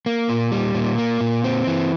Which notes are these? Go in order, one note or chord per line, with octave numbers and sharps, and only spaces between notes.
A#3
A#2
G3
A#2
A#3
A#2
C4
E3